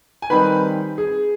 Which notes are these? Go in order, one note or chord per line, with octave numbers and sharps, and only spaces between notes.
G#5
D#3 G3 C4 D#4 B4 B5
G#4